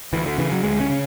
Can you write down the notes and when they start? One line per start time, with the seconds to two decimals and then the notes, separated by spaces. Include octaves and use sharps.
0.13 D2 E3
0.26 D3
0.38 C#3 E3
0.52 F#3
0.63 D2 G#3
0.80 C#4
0.90 C#3